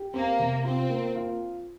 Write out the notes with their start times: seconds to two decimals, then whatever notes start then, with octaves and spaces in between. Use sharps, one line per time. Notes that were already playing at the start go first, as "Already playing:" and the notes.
Already playing: G4
0.14 A#3 C4
0.39 C3
0.64 C4 F4
0.90 A#3
1.15 F4